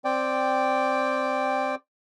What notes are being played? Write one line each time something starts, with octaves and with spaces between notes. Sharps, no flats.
C4 D5 G5